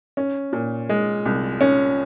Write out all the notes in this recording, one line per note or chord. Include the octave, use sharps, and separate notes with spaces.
C#4
A#2
G#3
C2
C#4